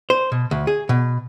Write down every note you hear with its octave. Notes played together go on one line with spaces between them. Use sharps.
C5
B2
D2
G#4
B2